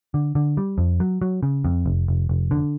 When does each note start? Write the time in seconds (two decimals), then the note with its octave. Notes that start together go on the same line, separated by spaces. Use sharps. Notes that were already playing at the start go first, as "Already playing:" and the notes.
0.14 D3
0.35 D3
0.57 G3
0.78 F2
1.00 F#3
1.22 F#3
1.43 C#3
1.64 F2
1.86 F1
2.08 F1
2.29 F1
2.51 D3